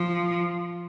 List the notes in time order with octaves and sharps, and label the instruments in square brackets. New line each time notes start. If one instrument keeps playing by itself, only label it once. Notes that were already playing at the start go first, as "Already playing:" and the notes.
Already playing: [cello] F3